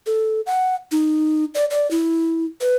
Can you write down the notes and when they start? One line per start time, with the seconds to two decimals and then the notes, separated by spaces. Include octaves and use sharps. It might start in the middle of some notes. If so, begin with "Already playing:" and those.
0.07 A4
0.46 F#5
0.92 D#4
1.55 D5
1.71 D5
1.91 E4
2.61 B4